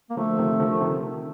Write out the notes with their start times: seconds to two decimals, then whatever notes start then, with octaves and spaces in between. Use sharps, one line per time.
0.10 A#3
0.17 D3 F3 A3
0.39 C3 D#3
0.60 D3 F3
0.81 C3 D#3